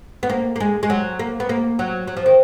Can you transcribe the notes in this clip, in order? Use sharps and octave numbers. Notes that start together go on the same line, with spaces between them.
B3
A#3
A#3
G#3
G#3
F#3
A#3
B3
A#3
F#3
F#3
F3
D#3